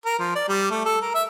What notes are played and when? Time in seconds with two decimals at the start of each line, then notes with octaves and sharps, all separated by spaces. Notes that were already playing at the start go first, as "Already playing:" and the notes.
0.05 A#4
0.19 F3
0.35 D5
0.48 G3
0.71 A3
0.85 A4
1.02 A#4
1.15 E5